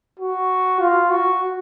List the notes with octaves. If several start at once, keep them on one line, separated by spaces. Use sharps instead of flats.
F#4
F4
F#4